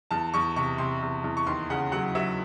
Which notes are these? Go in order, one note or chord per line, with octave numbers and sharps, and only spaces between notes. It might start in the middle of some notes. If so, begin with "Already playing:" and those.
E2 A5
E2 C#6
C3 C#6
C3 C6
E2
E2
C#6
D#2 C6
C#3 F#5
F#3 F#5
F#3 E5